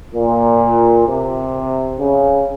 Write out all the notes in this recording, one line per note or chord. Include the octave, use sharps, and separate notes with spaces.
A#2
C3
C#3